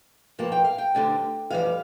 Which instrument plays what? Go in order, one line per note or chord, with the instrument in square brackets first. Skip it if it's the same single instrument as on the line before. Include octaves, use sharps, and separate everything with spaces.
[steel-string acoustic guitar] G2 F3 A#3 A5
G5
F5
G5
D2 D3 G3 D4
F2 E3 G3 F5